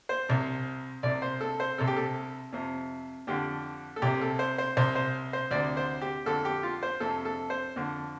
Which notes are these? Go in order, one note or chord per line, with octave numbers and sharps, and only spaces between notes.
C5
C2 C3
C2 C3 D5
C5
A4
C5
C2 C3 A4
G4
A4
F2 C3
F2 D3 G4
A4
C2 C3 G4
A4
C5
C5
C2 C3 C5
C5
C5
D2 C3 D5
C5
G4
F2 D3 A4
G4
F4
C5
F2 C3 A4
A4
C5
F2 D3